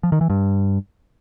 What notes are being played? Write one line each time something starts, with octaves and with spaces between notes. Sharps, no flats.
F3
D#3
E3
G2